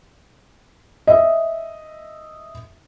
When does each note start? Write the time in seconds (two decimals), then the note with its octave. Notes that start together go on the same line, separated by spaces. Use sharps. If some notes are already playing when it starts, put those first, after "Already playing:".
1.07 D#5 E5